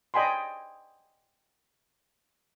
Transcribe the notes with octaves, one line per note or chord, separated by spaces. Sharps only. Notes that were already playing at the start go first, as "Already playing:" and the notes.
D5 D#5 G5 G#5 B5 C6